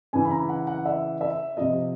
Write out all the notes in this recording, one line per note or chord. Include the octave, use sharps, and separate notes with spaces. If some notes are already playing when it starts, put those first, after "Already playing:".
C#3 E3 G#5
B5
A#5
F#5
F#5
E5
E5
C3 F3 D#5